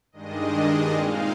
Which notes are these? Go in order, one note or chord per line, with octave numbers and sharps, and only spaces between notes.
G2 D#3 G#3 D4 D#5
A#2 G#3 C4 D#4 F5